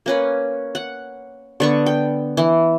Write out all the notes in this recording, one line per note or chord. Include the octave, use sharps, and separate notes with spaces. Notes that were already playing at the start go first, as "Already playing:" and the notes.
A#3 C#4 B4
F#5
D3 B3 C#6
G5
E3